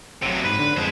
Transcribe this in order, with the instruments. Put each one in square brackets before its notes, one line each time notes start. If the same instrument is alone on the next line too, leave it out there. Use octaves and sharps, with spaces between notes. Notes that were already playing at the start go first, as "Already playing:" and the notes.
[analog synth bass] A1 [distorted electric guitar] C3 F#3
[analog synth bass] G#2 [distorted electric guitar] B4
[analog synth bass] D3
[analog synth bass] F2 [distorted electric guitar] G#3 C5